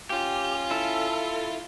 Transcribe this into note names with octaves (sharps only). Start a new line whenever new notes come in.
C#4 F4 G4
E4 A4